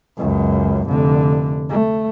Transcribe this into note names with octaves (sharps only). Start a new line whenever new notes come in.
C#2 F#2
F1 D3
A3